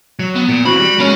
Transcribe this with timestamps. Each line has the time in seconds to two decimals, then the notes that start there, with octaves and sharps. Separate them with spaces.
0.19 F#3
0.35 B3
0.49 A#2
0.65 E3 C4 F#4 B5
0.80 G3
0.99 G#3 A#3 C#4 C#5